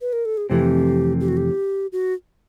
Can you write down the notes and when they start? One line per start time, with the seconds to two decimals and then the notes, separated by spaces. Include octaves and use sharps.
0.00 B4
0.13 A#4
0.25 A4
0.37 G#4
0.49 F2 C3 E3 A3 C4 G4
1.21 G4
1.28 F#4
1.37 G4
1.92 F#4